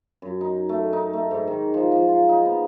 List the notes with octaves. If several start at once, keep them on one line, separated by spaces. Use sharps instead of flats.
F#2
D#4
A3
D#4
A3
G#2
D#3
F3
F3
F4
D#4
B3